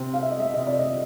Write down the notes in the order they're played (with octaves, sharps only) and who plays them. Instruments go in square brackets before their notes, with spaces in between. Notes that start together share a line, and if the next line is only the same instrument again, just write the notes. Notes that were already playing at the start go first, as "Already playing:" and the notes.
Already playing: [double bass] C3
[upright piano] F5
E5
D#5
E5
[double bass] C3 [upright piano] D#5
[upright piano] D5
D#5